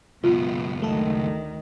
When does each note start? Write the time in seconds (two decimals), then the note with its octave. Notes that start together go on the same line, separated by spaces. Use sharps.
0.24 C#2 F#2 B2 B3 F4
0.82 D2 D#3 A3 A4